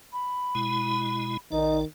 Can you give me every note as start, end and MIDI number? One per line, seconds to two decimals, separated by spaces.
0.13 1.38 83
0.55 1.37 47
0.55 1.37 56
0.55 1.37 64
1.52 1.85 34
1.52 1.84 51
1.52 1.78 63
1.52 1.85 74